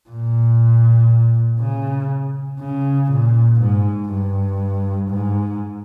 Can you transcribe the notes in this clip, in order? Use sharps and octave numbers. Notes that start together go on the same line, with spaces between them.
A#2
C#3
C#3
A#2
G#2
G2
G#2